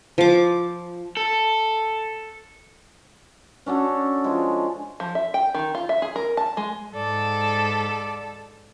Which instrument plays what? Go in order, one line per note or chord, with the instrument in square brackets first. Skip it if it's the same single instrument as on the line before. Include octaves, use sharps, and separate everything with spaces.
[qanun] F3 D6
[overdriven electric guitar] A4
[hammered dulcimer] C#4 D4 F#4 A4
F3 G#3
[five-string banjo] F3
E5
G5
D#3
F4
E5
G#4
A#4
A5
G#3
[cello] G#2 [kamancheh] A4 [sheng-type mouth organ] D5